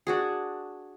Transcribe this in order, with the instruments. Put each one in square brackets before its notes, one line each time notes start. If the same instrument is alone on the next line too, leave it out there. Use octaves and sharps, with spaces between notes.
[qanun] D4 F#4 G#4